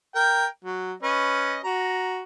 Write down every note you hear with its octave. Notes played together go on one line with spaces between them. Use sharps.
A#4 G5
F#3
C#4 B4 D#5
F#4 A#5